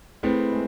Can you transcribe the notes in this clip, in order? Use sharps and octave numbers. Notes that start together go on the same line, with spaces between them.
A3 C4 E4 G#4 B4
G#3